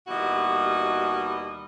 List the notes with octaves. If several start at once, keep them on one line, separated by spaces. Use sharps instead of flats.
D#2 B2 G3 E4 F#4 D#5